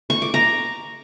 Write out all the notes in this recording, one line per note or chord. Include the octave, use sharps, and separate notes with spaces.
C#6
D6
A#5